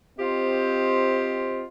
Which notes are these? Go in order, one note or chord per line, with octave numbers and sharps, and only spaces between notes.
C4 F4 G4 C5 D#5